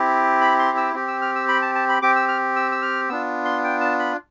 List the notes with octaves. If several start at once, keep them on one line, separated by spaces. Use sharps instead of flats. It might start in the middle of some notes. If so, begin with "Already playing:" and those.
Already playing: C4 E4 G4
B5
C6
E6
C4 G4
E6
F6
E6
B5
A5
A5
B5
C4 G4 D6
E6
F6
E6
E6
F6
B3 D4 F4 E6
C6
G5
A5
B5